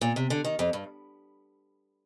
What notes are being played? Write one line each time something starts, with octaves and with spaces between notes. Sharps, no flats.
A#2
C3
D3
D#3
F2
G2